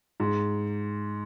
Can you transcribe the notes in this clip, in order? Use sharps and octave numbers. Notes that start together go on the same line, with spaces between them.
G#2